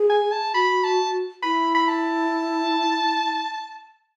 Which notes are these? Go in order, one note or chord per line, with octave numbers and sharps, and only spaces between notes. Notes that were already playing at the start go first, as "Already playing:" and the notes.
Already playing: G#4
G#5
A5
F#4 B5
A5
E4 B5
B5
A5